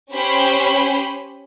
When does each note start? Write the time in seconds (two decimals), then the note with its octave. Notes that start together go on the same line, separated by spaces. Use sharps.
0.12 C#4 G4 C5 B5 G6